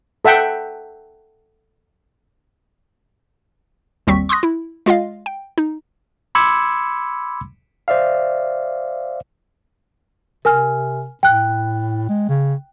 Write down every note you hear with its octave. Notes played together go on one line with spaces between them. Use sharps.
A4 E5 F#5 G5
G#1 D#2 G3 C4 C#6 B6
C6 C#6 D#6 F#6 A#6
E4
G#3 F4 D#5 F5
G5
D#4
B5 C6 D6 E6 G#6 C#7
C5 D5 E5 F5
C3 A#4 G#5 F6
A2 G5 F#6
G#3
C#3